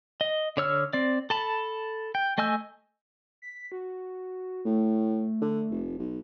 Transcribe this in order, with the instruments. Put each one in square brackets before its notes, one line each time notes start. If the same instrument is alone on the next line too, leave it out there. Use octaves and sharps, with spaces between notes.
[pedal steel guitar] D#5
D3 C#5 E6 F6
C4 D5
A4 A5 B5
G5
A3 D#5 G#5 E6 G6
[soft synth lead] B6
F#4
[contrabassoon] A2 [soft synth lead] A3
[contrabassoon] D3
F1
B1